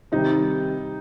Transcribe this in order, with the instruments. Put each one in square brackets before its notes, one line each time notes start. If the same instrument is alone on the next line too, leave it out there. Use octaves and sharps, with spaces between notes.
[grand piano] C3 D#3 G3 [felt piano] D#4